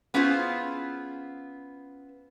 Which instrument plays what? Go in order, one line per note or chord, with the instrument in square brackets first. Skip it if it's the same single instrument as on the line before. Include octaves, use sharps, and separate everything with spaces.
[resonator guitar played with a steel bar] B3 C#4 E4 F4 G#4 C5